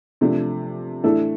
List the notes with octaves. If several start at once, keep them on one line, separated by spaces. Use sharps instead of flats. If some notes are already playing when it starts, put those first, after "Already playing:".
C3 F3 A3 D4
A2 E3 A3 D4 A4